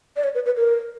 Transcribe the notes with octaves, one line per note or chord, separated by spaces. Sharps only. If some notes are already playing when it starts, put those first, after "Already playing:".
D5
C#5
B4
B4
A#4